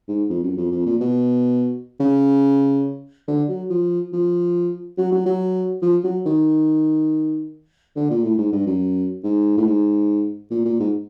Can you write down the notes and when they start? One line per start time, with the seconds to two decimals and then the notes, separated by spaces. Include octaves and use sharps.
0.08 G#2
0.30 F2
0.43 F#2
0.57 F2
0.71 F2
0.86 A#2
1.01 B2
2.00 C#3
3.28 D3
3.49 F#3
3.70 F3
4.13 F3
4.98 F#3
5.12 F#3
5.26 F#3
5.82 F3
6.04 F#3
6.26 D#3
7.96 D3
8.10 A#2
8.24 A2
8.38 G#2
8.52 G2
8.66 F#2
9.23 G#2
9.57 A2
9.66 G#2
10.51 A#2
10.65 A#2
10.80 G#2